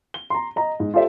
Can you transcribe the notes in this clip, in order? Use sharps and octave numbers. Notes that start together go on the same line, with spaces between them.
G7
A#5 C6
D#5 A#5
G#2
F4 G4 A4 C5 D5 E5